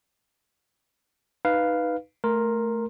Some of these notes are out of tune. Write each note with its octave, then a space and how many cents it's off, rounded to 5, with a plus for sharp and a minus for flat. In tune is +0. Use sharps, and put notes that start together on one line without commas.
D#4 +0 B4 +0 F5 +0
A3 +0 A#4 +0 C6 +15